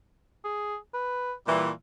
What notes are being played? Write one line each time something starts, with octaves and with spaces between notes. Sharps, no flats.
G#4
B4
A#2 E3 G3